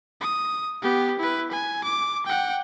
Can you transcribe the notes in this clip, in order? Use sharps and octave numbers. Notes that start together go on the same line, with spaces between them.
D#6
B3 G4
E4 B4
G#5
D6
F#5 G5